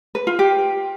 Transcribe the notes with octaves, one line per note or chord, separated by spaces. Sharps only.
B4
F4
G4